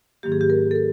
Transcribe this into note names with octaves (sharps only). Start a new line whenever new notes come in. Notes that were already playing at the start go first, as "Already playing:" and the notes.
G#2 D#3 F#3 A#3 G4
G#4
G4
A#4
A4
A#4